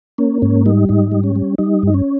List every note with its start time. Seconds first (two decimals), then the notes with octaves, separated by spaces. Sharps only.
0.18 A#3 C#4
0.42 G#2 C#4
0.66 G3 D#4
0.89 G#2 D#4
1.12 G3
1.23 C#4
1.36 G3
1.58 G3 D#4
1.83 G2 D#4
1.94 C#4